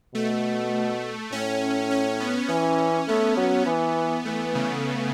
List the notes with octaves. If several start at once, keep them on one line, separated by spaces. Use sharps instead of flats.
B2 A3
A2 C#4
C#4
B3
E3 C#4
A3 B3
F#3
E3
E3 A3
C#3